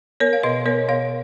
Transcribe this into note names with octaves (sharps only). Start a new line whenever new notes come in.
B3 A#4 C#5
F5
B2 B4 D#5
B3 A#4 C#5
B2 C#5 F5